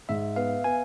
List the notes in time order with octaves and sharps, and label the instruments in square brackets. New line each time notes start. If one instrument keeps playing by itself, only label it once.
[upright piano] G#2 [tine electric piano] E5
[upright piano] B3 [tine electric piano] F5
[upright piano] B3 [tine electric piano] G#5